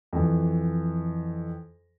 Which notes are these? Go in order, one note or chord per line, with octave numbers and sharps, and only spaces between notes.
F2 E3